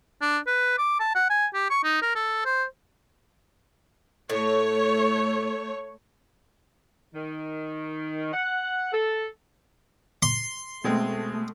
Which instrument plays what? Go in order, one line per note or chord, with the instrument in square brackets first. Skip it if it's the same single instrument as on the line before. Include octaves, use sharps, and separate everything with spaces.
[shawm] D4
B4
D6
A5
F#5
G#5
G4
C#6
D#4
A#4
A4
C5
[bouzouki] A2 [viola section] A3 C#5
[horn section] D#3
F#5
A4
[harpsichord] C6
[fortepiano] B2 G#3 C4 [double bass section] A3